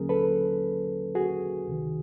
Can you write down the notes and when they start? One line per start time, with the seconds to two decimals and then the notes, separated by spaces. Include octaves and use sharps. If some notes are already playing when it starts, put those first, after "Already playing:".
Already playing: D#2 D3 F#3 A#3 C#4 G#4 A#4
0.09 A4 B4
1.15 F#4 G#4
1.67 C#2 C3 D#3